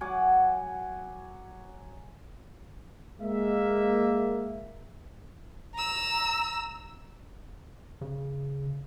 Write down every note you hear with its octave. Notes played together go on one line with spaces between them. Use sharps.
F#3 F#5 G#5 D6
G#3 A#3 E5
A#5 E6
C#3